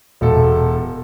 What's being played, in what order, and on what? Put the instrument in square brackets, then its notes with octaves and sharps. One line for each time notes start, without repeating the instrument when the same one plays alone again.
[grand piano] E1 A4